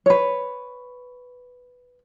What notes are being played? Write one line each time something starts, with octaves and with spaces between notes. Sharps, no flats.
B4 C#5